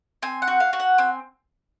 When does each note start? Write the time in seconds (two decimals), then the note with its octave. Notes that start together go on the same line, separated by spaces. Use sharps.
0.22 C4 G#5
0.42 F#5
0.48 F#4
0.60 F5
0.73 F#4
0.80 F#5
0.98 C4 G#5